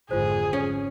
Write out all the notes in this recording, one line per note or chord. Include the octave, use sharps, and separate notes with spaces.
G#1 F2 D3 F4 G#4 C5
C#4